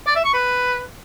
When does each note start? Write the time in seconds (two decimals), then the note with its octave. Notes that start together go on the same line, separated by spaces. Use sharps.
0.06 D5
0.15 E5
0.24 C#6
0.33 B4